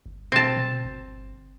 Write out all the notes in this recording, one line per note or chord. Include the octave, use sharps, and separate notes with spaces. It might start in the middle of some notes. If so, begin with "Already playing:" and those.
G1
B2 C4 A5
B2
G1